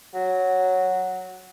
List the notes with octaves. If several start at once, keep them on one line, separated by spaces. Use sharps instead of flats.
F#3